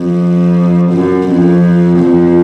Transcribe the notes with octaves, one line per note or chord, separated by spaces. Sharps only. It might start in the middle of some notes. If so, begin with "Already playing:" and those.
Already playing: F2
F#2
F2
F2